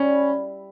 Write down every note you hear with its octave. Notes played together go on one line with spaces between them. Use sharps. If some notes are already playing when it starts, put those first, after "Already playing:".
Already playing: G3 C#4
E4